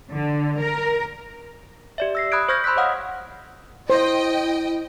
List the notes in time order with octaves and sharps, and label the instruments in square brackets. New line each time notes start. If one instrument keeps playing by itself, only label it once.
[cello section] D3
A#4
[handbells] G4 D5 E5
E6 A#6 C7
B5 D#6 F#6 G#6 D7
C5 C#6 F6 G6 G#6 A#6
B5 C6 E6 F#6 B6
C#5 D#5 F5 F#5 D#6 F6
[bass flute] E4 [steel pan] C5 [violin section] D#5 G5